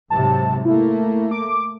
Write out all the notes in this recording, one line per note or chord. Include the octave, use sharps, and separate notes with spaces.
G#2 C3 F#3 A5
A3 A#3 E4
D6